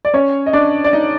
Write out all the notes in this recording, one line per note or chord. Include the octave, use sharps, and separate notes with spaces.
D5
C#4 C#5
D#5
D4 D5
D5
D#4 D#5